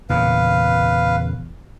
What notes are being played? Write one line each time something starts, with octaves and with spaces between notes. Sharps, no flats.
E2 A#2 C#3 B4 F5